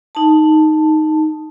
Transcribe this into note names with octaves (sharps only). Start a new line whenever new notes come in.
D#4 A5